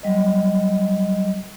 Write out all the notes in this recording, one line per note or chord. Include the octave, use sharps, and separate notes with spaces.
F#3 G3 D#5